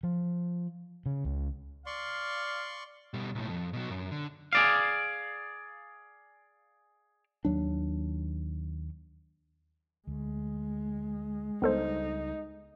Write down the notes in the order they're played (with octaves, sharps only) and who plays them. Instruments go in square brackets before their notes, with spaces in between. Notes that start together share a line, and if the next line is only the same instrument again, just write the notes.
[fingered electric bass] F3
C#3
C#2
[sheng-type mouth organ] D5 C6 C#6 [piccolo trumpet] F5
[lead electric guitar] B2 G3
B1 A2
F2
B2 F#3
F#2
D3
[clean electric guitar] G#4 D5 F5
[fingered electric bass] D#2 F#3 D4
[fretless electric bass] D2 [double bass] G#3
[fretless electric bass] C#2 G3 D4 [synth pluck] B3 A4 C5 [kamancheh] D#4